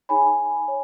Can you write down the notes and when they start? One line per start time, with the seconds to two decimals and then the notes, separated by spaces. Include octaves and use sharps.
0.09 D#4 G#4 C#5 G#5 B5
0.68 C#5